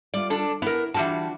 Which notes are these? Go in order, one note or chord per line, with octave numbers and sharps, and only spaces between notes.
G3 F4 D5
D4 A4
B3 E4 A#4
E3 G3 D4 F4 F#4 A5